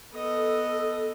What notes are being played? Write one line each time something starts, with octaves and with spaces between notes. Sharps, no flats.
B3 A4 D#5